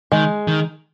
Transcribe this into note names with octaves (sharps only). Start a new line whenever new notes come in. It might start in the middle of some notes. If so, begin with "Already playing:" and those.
D#3 G#3
D#3